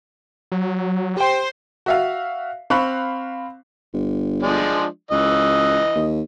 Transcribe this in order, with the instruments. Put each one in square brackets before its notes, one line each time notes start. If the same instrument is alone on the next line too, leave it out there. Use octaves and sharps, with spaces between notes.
[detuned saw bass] F#3
[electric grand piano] G4 G5 [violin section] C5 C6
[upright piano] F#4 E5 F5
C4 F5 B5 C#6 F#6
[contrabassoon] G1
[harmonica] F3 G#3 D4
[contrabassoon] C#2 [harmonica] E3 D#5
[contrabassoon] D#2